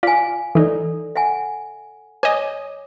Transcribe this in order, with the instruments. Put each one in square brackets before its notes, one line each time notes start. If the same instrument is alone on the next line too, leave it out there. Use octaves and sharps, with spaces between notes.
[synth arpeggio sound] F4 D5 [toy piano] F5 G#5
[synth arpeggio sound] E3 D#4 [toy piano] A4 D5
[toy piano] E5 F#5 G#5
[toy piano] C#5 D6 [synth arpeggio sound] D#5 G#5